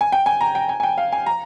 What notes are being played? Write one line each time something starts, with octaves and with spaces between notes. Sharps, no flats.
G#5
G5
G#5
A#5
G5
G#5
G#5
G5
F5
G#5
A#5